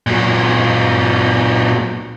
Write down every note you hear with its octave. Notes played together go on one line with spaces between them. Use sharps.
A#2 F#3